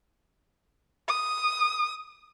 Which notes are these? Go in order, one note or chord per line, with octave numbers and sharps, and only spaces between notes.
D#6